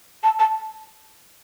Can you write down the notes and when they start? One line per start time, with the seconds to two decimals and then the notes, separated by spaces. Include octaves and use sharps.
0.24 A5
0.39 A5